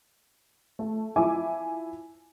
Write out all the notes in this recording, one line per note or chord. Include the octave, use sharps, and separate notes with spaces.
A3
F3 E4 G#5 D6